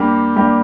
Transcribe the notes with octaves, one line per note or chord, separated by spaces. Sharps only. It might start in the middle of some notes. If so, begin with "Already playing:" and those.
Already playing: G2 G3 A#3 G4
G2 G3 A#3 G4